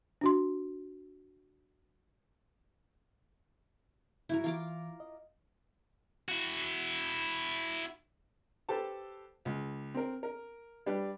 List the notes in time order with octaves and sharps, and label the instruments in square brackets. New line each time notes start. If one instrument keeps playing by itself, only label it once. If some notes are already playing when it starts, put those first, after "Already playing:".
[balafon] D4 F#4 C6
[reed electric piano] G2 F3 [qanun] E4 F#4 A#4
[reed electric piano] E3 [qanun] F4 A#4 D6
[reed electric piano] D#5
[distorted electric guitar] E4 F#4
[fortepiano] G4 A4 B4 C5 A5
C#2
C4 A#4
A#4
G3 D4 G4 B4